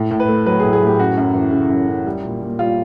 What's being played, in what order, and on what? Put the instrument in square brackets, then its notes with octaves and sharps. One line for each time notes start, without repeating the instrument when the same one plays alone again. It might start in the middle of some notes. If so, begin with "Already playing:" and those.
Already playing: [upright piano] A2
A2
B4
A3
F#3 B4
G#4
A2
G#4
A2 G4
F#2 F#4
F#2
E3
C#3
F#2
F#2
G3
A#2
A#2
G3 F4